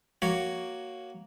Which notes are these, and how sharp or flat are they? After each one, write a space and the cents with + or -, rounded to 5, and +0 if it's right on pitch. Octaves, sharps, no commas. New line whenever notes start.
A#3 +0 F#4 +5 C#5 +5